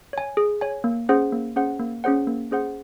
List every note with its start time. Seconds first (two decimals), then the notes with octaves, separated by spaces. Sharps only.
0.13 C#5 G#5
0.37 G#4
0.61 C#5 G#5
0.84 A#3
1.09 C#4 G#4 C5 F#5
1.32 A#3
1.56 C#4 G#4 C5 F#5
1.79 A#3
2.04 C#4 G#4 C5 F#5
2.27 A#3
2.51 C#4 G#4 C5 F#5